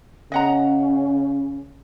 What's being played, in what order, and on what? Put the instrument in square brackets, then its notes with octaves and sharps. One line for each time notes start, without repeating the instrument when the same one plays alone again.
[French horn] C#3 [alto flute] C#4 [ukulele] D#5 F#5 A#5